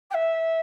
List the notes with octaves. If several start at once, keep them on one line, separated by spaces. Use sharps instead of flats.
G5
E5